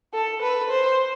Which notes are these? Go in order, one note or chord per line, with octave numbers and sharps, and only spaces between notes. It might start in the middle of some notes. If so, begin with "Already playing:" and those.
A4
B4
C5